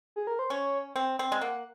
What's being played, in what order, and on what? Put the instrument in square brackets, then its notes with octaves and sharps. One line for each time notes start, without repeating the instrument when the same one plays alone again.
[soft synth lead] G#4
A#4
C5
[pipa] C#4 [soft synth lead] C#5
[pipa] C4
C4
G#3
[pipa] A#3 [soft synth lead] F#5